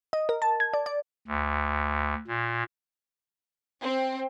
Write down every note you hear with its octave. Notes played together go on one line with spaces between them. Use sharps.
D#5
A#4
A5
G#6
D5
D5
D2
A#2
C4